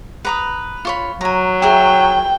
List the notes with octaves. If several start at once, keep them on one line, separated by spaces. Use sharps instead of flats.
B4 A#5 D#6
F4 C#5 B5
F#3 G#5 A#5
G#4 A#4 E5 G5